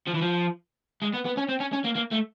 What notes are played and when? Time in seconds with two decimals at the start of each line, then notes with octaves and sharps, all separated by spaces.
0.07 F3
0.15 E3
0.22 F3
1.02 G#3
1.14 B3
1.25 B3
1.37 C#4
1.49 C4
1.60 C#4
1.73 C#4
1.84 A#3
1.95 A#3
2.11 A3